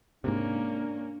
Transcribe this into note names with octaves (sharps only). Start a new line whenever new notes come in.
G#2 C3 A#3 C#4 D4